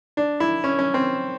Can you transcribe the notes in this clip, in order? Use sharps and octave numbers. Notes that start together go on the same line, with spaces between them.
D4
E4
C#4
C#4
C4